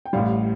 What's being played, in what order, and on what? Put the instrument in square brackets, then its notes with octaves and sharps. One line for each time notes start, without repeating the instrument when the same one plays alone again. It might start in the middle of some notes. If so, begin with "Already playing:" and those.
[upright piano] G5
A1 A2 G3 F5